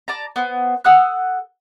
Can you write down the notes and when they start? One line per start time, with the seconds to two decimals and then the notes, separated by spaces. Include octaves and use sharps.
0.08 D5 A5 A#5
0.36 B3 C5
0.84 A4 F#5 D#6 F#6